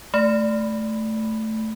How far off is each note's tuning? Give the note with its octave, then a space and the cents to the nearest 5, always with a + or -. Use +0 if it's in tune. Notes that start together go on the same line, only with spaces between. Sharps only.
A3 +0 B5 +0